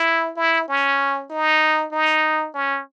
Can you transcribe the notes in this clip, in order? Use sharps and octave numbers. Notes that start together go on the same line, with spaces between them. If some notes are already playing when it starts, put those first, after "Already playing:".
Already playing: E4
E4
C#4
D#4
D#4
C#4